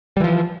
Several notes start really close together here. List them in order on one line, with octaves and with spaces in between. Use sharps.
G3 E3 F3